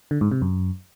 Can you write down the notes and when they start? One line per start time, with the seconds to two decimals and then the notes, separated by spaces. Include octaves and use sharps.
0.11 D3
0.21 G#2
0.31 C3
0.42 F#2